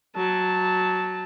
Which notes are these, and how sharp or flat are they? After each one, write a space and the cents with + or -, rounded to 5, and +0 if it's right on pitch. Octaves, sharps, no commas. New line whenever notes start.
F#3 +0 A5 +0